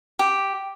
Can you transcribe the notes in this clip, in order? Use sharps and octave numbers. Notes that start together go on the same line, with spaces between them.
G4